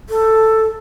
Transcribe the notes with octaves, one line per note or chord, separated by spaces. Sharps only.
A4